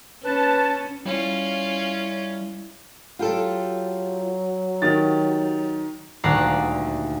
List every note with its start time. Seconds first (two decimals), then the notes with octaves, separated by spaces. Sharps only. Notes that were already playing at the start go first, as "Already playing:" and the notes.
0.24 C#4 B4 A5
1.06 G3 C#4 E4 F4
3.19 F#3 F4 G4 A4
4.82 D#3 G4 A6
6.23 D#1 D2 A#5 D6 F#6 C7